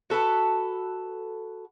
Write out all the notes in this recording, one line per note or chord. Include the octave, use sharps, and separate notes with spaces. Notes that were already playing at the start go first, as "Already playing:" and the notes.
F#4 A4 B4 F#5